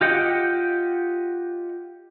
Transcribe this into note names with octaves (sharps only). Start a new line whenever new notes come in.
F4 G4 D#5 F#5 G5